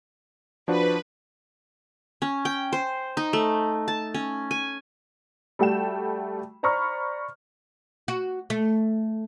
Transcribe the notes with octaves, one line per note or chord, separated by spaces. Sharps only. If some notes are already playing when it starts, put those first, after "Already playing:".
F3 D4 F#4 B4
C#4
G5
C5
D#4
A3
A5
C#4
G#5
G3 A3 F#4 G5 E7
C5 D5 A#5 B5 C#6 F6
F#4
A3